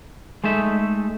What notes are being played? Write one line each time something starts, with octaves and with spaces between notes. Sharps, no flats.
G#3 A3 D#4 E5